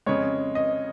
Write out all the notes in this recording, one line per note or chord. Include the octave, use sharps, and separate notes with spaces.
F2 C#3 G#3 C#5
D#5